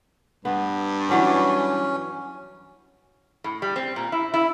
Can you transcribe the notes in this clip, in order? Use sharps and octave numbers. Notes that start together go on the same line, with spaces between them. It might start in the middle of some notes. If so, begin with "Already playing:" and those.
G2 B3
E3 F#3 C#4 D5
A2
G3
C4
A#2
E4
E4